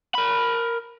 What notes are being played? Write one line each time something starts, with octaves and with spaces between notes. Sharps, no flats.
A#4 B5